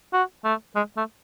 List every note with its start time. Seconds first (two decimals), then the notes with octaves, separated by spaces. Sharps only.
0.13 F#4
0.44 A3
0.76 G#3
0.97 A3